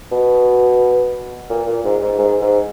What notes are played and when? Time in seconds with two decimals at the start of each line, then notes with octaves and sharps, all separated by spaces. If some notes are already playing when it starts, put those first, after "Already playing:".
0.12 B2
1.50 A#2
1.67 A#2
1.84 G#2
2.02 G#2
2.19 G#2
2.42 G#2